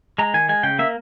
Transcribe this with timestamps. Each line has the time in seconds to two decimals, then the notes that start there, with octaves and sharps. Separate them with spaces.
0.18 G#3 A#5
0.34 D#3 G#5
0.49 G#3 G#5
0.63 C#3 G5
0.79 A#3 E5